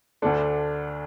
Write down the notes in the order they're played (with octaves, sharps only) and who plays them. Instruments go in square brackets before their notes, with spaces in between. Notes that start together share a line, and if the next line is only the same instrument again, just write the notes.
[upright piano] D2 D3 A3 D4